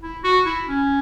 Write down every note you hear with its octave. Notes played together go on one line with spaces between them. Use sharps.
E4
F#4
E4
C#4